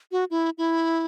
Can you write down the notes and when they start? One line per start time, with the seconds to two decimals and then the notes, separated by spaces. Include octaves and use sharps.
0.12 F#4
0.31 E4
0.58 E4